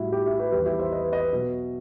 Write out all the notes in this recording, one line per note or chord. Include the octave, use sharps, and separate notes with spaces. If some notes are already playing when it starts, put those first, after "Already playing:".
Already playing: A2 G3 E4 F#4
E4 G4
E4
G4 B4
E2 D#3 G3 G4 B4
E4 G4
C5 E5
B4 D#5
B4 D#5
B2 F#3